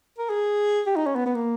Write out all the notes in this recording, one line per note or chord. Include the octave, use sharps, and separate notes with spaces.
A#4
G#4
G4
D#4
C#4
B3
B3
A#3